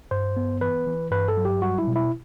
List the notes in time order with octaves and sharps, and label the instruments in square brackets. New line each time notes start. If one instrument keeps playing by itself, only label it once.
[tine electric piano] G2 C5
B3
E3 B4
E3
G2 B4
A4
F#3
G4
G3 F#4
E4
B2
E4